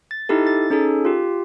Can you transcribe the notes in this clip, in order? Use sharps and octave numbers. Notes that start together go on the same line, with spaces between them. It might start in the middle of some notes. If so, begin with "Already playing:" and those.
A6
D#4 E4 G4 A4
A6
C#4 D#4 G#4 A4
F4 G4